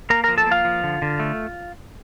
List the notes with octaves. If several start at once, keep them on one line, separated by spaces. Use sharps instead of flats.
A#3 A#4 A#5
F3 A#4 A#5
A4 A5
A#3
F4 F5
F3
D3
D3
A3